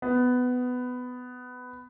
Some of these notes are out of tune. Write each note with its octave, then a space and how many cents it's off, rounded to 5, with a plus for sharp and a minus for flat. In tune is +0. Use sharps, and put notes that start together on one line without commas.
B3 +15